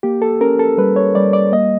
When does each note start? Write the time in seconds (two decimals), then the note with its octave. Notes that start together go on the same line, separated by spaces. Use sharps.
0.03 A#3 G4
0.22 A4
0.41 C#4 A#4
0.59 A4
0.78 G3 B4
0.96 C#5
1.15 G3 D5
1.33 D5
1.52 A#3 D#5